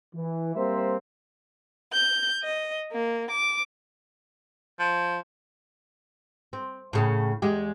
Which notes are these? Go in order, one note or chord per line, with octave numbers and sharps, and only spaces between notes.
E3
G3 A#3 C4 C5 E5
G6
D#5
A#3
D6
F3
C4
A2 C#3 C#4
E2 G#3 G4